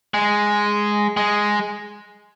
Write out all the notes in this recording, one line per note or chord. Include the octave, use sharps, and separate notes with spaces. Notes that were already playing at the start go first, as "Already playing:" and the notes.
G#3
G#3